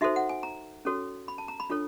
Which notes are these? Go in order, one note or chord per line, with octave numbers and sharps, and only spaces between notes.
D#4 F#4 A4 C5 E5
F#5
G#5
A#5
C#4 F#4 A4 C#5
B5
A5
A#5
B5
D4 F4 A4 C#5